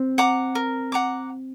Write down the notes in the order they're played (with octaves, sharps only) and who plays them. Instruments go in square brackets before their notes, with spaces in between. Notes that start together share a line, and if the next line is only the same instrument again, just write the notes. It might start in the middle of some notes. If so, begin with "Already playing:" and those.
Already playing: [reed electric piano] C4
[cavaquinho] F#5 A#5 D6
A#4
F#5 A#5 D6